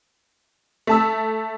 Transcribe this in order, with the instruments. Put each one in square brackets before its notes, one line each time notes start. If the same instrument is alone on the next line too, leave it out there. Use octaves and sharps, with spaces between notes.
[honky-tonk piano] A3 A5 E6